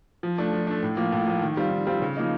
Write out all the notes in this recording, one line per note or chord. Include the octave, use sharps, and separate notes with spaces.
F3
A3 D4
F3
A3 D4
A2
F3 A#3
A2
F3 A#3
D#3
G3 C4 F4
D#3
G3 C4 F4
C#3
F3 A#3 D#4